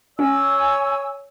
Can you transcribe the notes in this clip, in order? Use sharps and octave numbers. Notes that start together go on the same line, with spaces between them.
C#4 C#5 G#5 E6